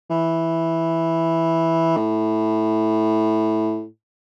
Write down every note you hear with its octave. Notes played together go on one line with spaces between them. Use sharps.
E3
A2